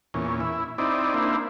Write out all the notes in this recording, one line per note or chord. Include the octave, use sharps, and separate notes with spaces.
E2 A#2 C#4
E4
C4 D#4 E4 D5
A#3 D4 E4 C5